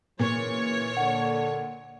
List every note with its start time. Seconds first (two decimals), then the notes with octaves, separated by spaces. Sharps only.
0.19 F#2 A#2 C#3 E3 C#5
0.97 D3 F#5